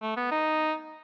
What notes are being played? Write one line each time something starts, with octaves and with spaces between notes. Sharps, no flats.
A3
B3
D#4